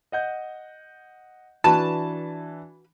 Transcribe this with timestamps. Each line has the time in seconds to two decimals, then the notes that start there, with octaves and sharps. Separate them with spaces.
0.12 D#5 F#5 G6
1.64 E3 D4 F#4 B4 A5 B5